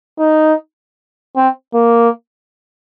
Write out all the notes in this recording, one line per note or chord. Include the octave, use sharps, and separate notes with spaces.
D#4
C4
A#3